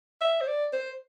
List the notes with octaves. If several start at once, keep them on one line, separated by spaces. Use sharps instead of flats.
E5
C5
D5
C5